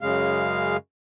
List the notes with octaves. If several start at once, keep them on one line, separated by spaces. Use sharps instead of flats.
F#2 C#3 G#3 F5